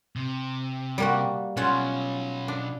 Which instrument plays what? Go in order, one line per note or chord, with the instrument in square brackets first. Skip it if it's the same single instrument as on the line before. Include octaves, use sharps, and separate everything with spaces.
[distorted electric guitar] C3
[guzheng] G3 A#3 F#4
[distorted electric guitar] B2 F#3 [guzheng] C#4 F4 F#5
[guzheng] D4